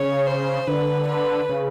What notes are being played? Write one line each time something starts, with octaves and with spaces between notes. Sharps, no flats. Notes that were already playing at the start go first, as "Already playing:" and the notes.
Already playing: C#3 C#5
C5
D3 B4
B4
C#3